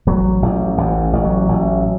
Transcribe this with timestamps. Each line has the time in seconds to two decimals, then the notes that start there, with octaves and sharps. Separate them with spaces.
0.07 A1 F#3
0.42 A1
0.77 A1 E3
1.13 A1
1.24 F#3
1.49 A1